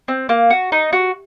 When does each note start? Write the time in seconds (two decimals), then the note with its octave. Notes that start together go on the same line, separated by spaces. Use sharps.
0.08 C4
0.29 A#3
0.50 F#4
0.72 D#4
0.93 F#4